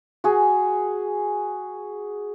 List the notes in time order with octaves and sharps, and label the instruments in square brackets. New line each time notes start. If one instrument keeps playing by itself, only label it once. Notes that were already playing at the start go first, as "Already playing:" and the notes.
[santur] F#4 G#4